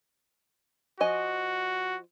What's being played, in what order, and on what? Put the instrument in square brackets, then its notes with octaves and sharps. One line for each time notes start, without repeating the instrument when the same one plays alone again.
[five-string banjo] F3 D#5 G#5 [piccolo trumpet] F#4